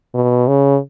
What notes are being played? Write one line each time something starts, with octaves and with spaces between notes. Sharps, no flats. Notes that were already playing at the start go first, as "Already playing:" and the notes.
B2
C#3